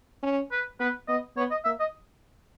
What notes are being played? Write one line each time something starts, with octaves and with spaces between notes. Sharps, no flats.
C#4
B4
B3 B4
B3 D#5
B3 C#5
D#5
A#3 E5
D#5